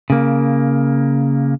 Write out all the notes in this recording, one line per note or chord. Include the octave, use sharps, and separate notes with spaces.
C#3 A#3